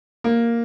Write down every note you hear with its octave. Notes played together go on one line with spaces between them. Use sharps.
A#3